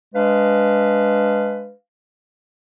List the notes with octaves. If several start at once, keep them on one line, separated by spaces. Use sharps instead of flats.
G#3 D4 B4 F5